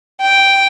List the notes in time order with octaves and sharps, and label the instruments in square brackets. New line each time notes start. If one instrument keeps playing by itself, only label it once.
[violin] G5